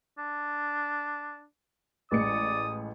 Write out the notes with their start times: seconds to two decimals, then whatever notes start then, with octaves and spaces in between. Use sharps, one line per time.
0.19 D4
2.12 A1 G#3 D5 D#6 C#7